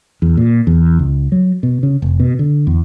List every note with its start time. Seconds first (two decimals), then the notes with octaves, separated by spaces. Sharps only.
0.22 E2
0.37 A#2
0.67 E2
0.99 C#2
1.32 F#3
1.63 B2
1.83 C#3
2.02 F1
2.20 B2
2.39 D3
2.67 E2